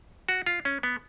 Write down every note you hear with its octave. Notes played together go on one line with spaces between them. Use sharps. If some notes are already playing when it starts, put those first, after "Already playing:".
F#4
F4
C#4
B3